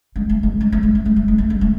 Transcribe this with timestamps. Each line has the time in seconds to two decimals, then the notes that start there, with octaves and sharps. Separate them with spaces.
0.16 G#3
0.29 A3
0.43 G#3
0.61 G#3
0.72 A3
0.83 G#3
0.95 A3
1.05 G#3
1.16 A3
1.28 G#3
1.38 A3
1.50 G#3
1.61 A3